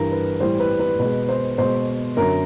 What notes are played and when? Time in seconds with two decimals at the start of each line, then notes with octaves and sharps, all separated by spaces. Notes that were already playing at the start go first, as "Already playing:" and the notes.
Already playing: G2 E3 G3 A#4
0.12 B4
0.40 A2 E3 G3 C5
0.60 B4
0.80 B4
0.99 B2 G#3 B4
1.29 C5
1.58 B2 G#3 C5
2.17 F#2 D3 F#3 A#4